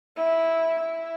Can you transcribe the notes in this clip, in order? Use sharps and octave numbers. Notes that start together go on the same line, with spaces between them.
E4
E4